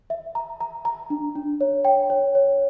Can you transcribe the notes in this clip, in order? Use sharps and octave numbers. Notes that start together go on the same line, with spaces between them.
E5
A#5
A#5
A#5
D4
D4
C#5
G5
C#5
C#5